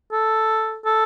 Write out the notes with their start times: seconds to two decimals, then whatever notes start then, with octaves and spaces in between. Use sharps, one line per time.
0.12 A4
0.85 A4